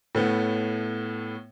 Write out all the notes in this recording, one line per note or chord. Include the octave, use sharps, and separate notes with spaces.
A2 A3 B3